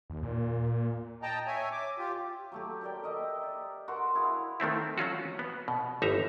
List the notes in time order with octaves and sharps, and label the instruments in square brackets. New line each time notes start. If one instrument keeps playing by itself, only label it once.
[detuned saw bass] D#2
A#2
[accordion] D#5 G5 A5 A#5
C#5 E5 G#5
D6
F4 G4
[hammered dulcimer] F#3 A3 G4
G4 A#4 D5 G5
A#4 D#5 E5
D5
F#4 A#4 F#5 C6
E4 G#4 F5
[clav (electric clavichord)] D#3 A3 C4 E4
F#3 C#4 F4 F#4
B3
B2
G1 D#4 E5 A#5